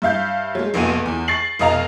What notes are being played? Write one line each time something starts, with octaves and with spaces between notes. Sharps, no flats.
G2 E5 F5 G6
F#3 G#3
F1 A#1 A#2 B3 F#4 D#7
E2
C#6 A6 C7 F#7
F1 B2 D#5 F5 A#5 F7